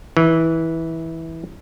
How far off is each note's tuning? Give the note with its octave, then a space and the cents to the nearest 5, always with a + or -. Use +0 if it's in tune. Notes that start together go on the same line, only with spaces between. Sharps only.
E3 -15